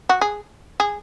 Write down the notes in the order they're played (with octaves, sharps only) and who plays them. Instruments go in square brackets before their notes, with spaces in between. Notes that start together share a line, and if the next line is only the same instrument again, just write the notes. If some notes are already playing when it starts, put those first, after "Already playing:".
[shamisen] F#4
G#4
G#4